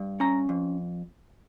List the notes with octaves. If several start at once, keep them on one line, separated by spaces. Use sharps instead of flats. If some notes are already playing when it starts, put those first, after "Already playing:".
Already playing: G2
C#4 A#5
F2